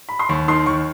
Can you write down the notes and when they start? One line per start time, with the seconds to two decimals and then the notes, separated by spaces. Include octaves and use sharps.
0.09 B5
0.19 C6
0.29 D#2 C#6
0.48 D#3 C6
0.66 D#2 C#6